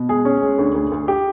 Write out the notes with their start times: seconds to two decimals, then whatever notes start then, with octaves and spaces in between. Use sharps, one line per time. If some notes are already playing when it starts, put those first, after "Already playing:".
Already playing: B2
0.09 G#3 G#4
0.25 C#4
0.42 G#3
0.58 D2
0.75 D2
0.92 D2
1.08 G4